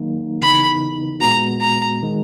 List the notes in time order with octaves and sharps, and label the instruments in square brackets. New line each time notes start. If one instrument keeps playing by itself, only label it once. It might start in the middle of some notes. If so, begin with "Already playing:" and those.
Already playing: [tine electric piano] D#3 F#3 A#3 D#4
[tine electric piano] C#3 E3 B3 D#4 [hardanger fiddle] B5
[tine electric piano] A#2 G#3 B3 F#4 [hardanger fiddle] A#5
[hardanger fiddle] A#5
[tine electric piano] D#3 G#3